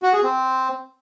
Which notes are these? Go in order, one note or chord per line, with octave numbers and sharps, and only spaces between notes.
F#4
G#4
C4